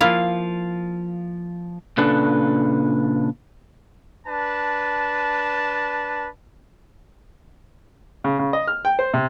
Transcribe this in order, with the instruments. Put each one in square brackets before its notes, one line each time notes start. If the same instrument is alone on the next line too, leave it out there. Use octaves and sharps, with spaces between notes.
[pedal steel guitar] F3 F5 [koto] A#3 E4 F4
[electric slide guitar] A#2 C#3 D4 A4 B4
[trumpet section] D4 B4 A5
[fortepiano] C#3
C#3
D#5
F6
G5
C5
C3